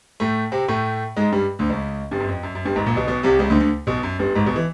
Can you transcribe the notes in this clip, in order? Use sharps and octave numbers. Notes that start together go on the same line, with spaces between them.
A2 A3
C3 C4
A2 A3
G#2 G#3
G2 G3
D2 D3
C#2 C#3
G1 G2
F#2
F2
F#2
F#2
G1 G2
G#1 G#2
A#1 A#2
B1 B2
B1 B2
C2 C3
C#2 C#3
D2 D3
D2 D3
B1 B2
F#2
G1 G2
G#1 G#2
B1 B2
E3